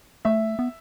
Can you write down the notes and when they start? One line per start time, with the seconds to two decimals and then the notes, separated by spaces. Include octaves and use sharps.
0.25 A3 E5
0.59 B3